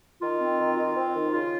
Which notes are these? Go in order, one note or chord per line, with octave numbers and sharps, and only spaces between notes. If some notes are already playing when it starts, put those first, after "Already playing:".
D#3 F4
C4
D#3
D#3 F4
C4
D#3
C#3 F4